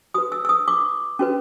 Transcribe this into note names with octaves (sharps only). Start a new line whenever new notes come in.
F#4 B4 D#6
E6
E6
D#6
D6
C#4 F#4 B4